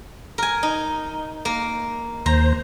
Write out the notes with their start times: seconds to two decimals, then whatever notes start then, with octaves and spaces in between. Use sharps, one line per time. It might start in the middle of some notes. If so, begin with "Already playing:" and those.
0.38 A#4 G#5
0.63 D#4
1.45 A#3
2.26 D#2 C5 A#5